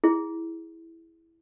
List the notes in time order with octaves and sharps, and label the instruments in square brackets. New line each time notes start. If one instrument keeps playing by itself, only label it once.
[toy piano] E4 G#4